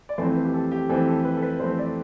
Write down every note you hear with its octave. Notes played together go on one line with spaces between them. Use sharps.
D5
F2 E3 A3 C4 C5
B4
G4
A4
G4
F2 E3 A3 C4 A4
A4
B4
A4
B4
F2 E3 A3 C4 C5
D5